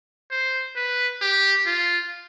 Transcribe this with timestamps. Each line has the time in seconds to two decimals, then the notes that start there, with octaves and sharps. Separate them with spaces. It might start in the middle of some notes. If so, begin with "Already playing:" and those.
0.31 C5
0.76 B4
1.21 G4
1.66 F4